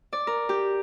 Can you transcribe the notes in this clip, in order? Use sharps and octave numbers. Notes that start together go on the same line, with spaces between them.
D5
A#4
G4